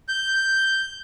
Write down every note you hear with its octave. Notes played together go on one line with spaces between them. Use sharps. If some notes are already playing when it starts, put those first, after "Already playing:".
G6